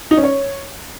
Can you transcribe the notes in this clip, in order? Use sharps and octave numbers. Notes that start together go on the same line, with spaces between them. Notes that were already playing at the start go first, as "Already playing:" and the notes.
D#4
C#4
C#5